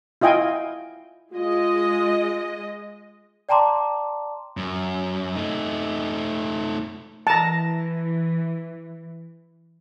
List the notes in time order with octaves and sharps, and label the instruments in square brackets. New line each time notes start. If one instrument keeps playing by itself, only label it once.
[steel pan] E4 F4 D#5 G5 G#5
[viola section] G#3 D#5 [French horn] F4
[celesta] D5 G5 A5 A#5 C6 D6
[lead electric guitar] F#2
A3 D#4
[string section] E3 [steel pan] A5 A#5